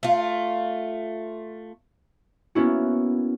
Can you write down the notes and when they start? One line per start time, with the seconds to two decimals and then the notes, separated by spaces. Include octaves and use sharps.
0.03 A3 F4
2.55 A#3 B3 C#4 E4 F#4